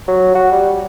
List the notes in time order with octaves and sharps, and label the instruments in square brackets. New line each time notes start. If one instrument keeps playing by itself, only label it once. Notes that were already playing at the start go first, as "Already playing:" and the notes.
[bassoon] F#3
F#4
G3